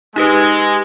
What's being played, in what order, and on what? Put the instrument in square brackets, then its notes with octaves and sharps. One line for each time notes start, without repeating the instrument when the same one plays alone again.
[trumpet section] G#3 [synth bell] D#4 G4 B4